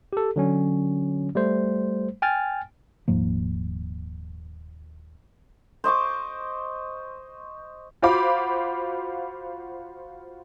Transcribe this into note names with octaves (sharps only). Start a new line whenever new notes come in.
G4 A4
D3 F#3 C#4
G3 A3 C5
G5 G#5 F6 A6
D#1 G#2 F3 A#3
C5 D#5 C#6 D6
F4 F#4 C5 F5 B5 D6